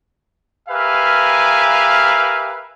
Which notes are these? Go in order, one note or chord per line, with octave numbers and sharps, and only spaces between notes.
G4 A#4 B4 E5 F5 G#5